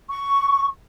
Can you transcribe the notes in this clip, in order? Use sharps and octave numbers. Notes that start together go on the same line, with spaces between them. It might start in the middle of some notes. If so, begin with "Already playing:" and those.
C#6